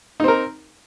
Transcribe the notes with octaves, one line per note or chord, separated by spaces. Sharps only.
C4 D#4 A#4